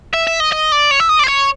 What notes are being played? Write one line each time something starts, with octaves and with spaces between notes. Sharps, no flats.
E5
E5
D#5
D#5
D5
C#5
E5
D#5
D5
C5
C#5